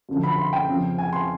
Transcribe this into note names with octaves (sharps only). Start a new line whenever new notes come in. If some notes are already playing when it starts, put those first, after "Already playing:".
F#2 D3 F3
B5
C6
G5
F2 C#3 F3
G#5
C6